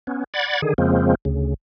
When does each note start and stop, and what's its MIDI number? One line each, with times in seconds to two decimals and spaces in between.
0.07 0.24 59
0.07 0.24 61
0.34 0.61 74
0.34 0.61 78
0.34 0.61 83
0.34 0.61 92
0.34 0.61 93
0.62 0.74 50
0.62 0.74 51
0.62 0.74 68
0.78 1.15 41
0.78 1.15 49
0.78 1.15 53
0.78 1.15 56
0.78 1.15 58
0.78 1.15 60
1.25 1.54 38
1.25 1.54 49